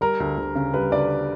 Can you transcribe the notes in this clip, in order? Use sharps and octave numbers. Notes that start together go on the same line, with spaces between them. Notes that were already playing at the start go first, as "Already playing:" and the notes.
G3 A#4
D2
D2
C#3
G3 B4
D2 D5